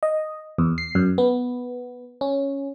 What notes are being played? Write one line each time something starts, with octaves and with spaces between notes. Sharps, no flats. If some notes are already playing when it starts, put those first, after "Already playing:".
D#5
E2
C7
F#2
B3
C#4